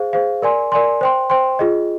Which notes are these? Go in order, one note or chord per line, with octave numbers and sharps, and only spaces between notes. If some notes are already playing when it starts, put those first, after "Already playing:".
Already playing: G#4 C5 F5
G#4 C5 F5
A#4 D5 G#5 C6
A#4 D5 G#5 C6
C5 G5 C6
C5 G5 C6
F4 G#4 D#5